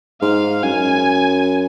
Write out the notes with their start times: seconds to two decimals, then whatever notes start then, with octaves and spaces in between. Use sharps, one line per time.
0.22 G#2 F5
0.63 F#2 G#5